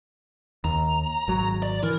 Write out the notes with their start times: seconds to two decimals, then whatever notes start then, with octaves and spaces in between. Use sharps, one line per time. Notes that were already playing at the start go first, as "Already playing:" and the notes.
0.64 D#2 A#5
1.28 G#1 F#3
1.63 D5
1.84 E3 A#4